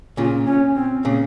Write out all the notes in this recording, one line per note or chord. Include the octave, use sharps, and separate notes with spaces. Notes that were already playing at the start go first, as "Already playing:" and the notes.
A#2 C#3 F4
C#4
C4
A#2 C#3